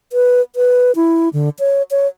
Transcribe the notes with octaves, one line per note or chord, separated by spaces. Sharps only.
B4
B4
E4
D3
C#5
C#5